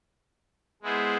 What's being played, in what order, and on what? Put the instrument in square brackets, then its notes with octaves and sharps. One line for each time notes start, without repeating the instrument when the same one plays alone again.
[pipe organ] G#3 B3 E4 G#4 C5